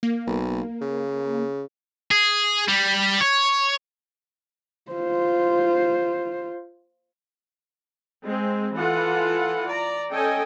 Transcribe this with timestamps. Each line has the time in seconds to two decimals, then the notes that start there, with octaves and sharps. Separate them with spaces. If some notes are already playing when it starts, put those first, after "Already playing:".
0.03 A#3
0.27 B1
0.81 C#3
2.11 G#4
2.68 G3
3.21 C#5
4.92 F4 C5
8.22 G#3 C4
8.75 E3 F4 A4 F#5
9.68 D5 A#5
10.12 C#4 A4 D#5 G5 G#5